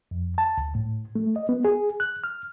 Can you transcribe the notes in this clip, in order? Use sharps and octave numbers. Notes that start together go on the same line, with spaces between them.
F2
A5
D2
A2
A3
D#5
B3
G#4
F#6
F6